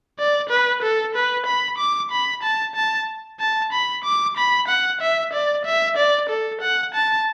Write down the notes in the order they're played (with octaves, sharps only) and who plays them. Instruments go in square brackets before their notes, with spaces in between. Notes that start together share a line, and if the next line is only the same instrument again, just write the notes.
[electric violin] D5
B4
A4
B4
B5
D6
B5
A5
A5
A5
B5
D6
B5
F#5
E5
D5
E5
D5
A4
F#5
A5